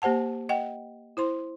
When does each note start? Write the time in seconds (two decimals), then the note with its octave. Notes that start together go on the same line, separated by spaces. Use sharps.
0.02 A#3 G4 C5 F#5 A5
0.49 D#5 F#5 G5
1.17 E4 C5 C6